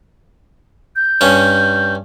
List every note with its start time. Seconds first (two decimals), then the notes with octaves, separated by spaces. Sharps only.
0.96 G6
1.21 G2 C#4